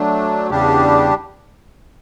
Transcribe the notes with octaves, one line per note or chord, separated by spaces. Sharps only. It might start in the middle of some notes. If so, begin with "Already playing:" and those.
Already playing: F#3 A3 D4
E2 C#3 G3 D4 G4